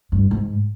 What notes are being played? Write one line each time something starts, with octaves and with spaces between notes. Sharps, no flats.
G2
G#2